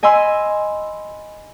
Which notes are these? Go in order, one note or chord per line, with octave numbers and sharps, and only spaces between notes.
D#5 G#5 B5 C6 E6